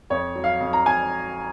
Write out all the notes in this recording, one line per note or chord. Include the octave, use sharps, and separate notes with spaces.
F2 C#5
F#3
F5
F2
A#5
F2 G#5